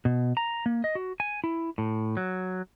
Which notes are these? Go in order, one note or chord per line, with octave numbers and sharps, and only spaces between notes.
B2
A#5
A#3
D#5
F#4
G#5
E4
A2
F#3